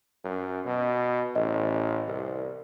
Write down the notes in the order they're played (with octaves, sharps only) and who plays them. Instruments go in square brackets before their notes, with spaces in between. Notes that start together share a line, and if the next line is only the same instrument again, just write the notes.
[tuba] F#2
B2
[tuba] A1 [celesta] D#5
[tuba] C2